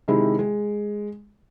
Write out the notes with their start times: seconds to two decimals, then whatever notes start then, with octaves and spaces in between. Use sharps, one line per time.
0.08 C3 D#3 G#3 E4
0.39 G#3